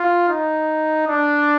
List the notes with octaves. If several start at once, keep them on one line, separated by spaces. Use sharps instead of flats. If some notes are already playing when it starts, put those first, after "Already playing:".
Already playing: F4
D#4
D4